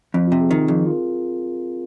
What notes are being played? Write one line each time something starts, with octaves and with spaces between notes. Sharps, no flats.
F2 C4
C3 F4
G#4
D#3 A#4
F2 G#4
F4